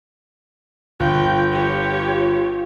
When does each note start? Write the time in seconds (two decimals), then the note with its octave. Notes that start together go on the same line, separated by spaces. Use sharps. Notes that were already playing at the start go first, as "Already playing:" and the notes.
1.00 G1 F4 G5
1.51 G4 C#5